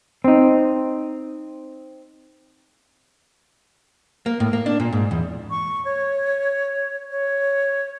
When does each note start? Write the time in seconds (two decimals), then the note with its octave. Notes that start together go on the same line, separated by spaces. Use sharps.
0.24 C4 D#4
4.26 A#3
4.40 A2
4.53 A#3
4.66 D4
4.80 A#2
4.93 G#2
5.11 E2
5.50 C#6
5.85 C#5
7.11 C#5